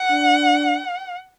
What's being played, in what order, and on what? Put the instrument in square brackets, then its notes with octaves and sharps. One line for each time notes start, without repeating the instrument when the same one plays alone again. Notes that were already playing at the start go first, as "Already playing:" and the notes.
Already playing: [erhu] F#5
[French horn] D4